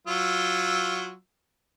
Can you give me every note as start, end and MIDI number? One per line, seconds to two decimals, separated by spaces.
0.07 1.13 54
0.07 1.13 65
0.07 1.13 88